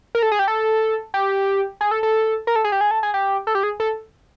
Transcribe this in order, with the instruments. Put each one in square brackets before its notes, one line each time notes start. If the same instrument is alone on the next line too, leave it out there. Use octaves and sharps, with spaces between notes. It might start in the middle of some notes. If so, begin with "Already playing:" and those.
[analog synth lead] A#4
A4
G#4
G4
A4
G4
G#4
A4
A4
A#4
A4
G#4
G4
G#4
A4
G#4
G4
A4
G4
G#4
A4